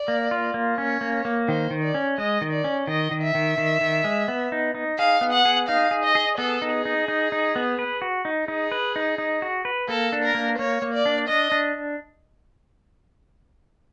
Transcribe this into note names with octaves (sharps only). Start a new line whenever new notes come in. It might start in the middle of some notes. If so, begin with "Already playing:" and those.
Already playing: D5
A#3
F4
A#3
C#4 C#5
A#3
A#3
D#3 C5
D#3
D5
C#4
G#3 D#5
D#3
D5
C#4
D#3 D#5
D#3
E5
D#3
D#3
D#3
G#3
B3
D#4
D#4
G#4 F5
B3
F#5
G#4
D#4 F5
G#4
D#5
G#4
B3 A4
D#4
G#4
D#4
D#4
D#4
B3
B4
F#4
D#4
D#4 G#4
B4
D#4
D#4
F#4
B4
A#3 A4
D4
A#4
A#3
A#3 C#5
A#3
D5
D4
D4 D#5
D4